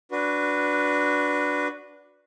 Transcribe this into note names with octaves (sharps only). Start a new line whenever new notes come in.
D4 F#4 B4